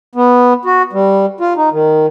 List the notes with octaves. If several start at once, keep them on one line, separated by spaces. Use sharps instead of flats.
B3
F#4
G3
F4
D#4
D#3